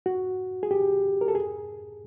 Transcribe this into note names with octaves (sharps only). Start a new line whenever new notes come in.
F#4
G#4
G4
A#4
A4
G#4